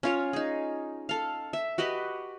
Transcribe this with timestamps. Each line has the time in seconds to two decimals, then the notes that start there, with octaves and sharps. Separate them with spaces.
0.03 C#4 F4 C#5
0.33 D#4 G#4
1.09 A4 F5
1.53 E5
1.78 F#4 G4 B4 D#5